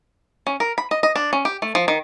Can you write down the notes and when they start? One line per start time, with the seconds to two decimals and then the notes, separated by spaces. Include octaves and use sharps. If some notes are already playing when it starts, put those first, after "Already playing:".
0.47 C#4
0.60 A#4
0.78 B5
0.91 D#5
1.03 D#5
1.16 D4
1.33 C#4
1.45 G4
1.62 A3
1.75 F3
1.88 D#3